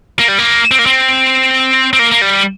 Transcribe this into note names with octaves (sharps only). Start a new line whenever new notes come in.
A#3
G3
A#3
C4
A#3
C4
C4
A#3
A#3
G3